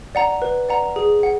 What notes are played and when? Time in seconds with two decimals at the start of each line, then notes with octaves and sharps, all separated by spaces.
0.15 D5 F#5 A#5
0.42 B4
0.69 D5 F#5 A#5
0.96 G#4
1.23 F#5